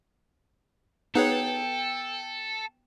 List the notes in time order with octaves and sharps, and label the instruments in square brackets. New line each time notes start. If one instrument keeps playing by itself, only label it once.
[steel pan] B3 F#5 [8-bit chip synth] D#4 G#4 C#5 [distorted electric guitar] A4 [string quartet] G5